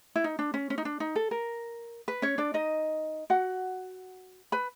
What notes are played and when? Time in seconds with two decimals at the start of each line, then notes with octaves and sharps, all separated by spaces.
0.16 E4
0.24 D#4
0.39 D4
0.54 C#4
0.70 C#4
0.78 D#4
0.85 D4
1.00 D#4
1.16 A4
1.31 A#4
2.08 B4
2.22 C#4 C#5
2.38 D4 D5
2.54 D#4 D#5
3.30 F#4 F#5
4.52 B4 B5